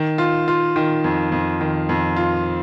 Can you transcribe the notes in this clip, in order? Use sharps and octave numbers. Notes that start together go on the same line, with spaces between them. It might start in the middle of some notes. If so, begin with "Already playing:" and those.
Already playing: D#3
F4
F4
D#3
F2
F2
D#3
F2
F4